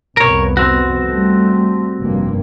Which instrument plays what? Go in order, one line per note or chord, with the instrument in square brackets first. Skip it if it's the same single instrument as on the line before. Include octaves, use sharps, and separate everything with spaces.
[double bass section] C2 F2 B3 [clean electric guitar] A#4 C#5
[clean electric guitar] C4 F#4
[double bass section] G3 A3
F1 G2 A#3